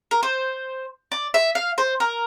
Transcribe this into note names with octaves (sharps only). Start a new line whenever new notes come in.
A#4
C5
D5
E5
F5
C5
A#4